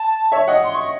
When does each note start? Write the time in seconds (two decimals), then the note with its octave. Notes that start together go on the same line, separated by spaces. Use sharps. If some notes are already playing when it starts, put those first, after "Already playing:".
Already playing: A5
0.32 C#5 E5
0.47 D#5 F#5
0.64 C6
0.75 C#6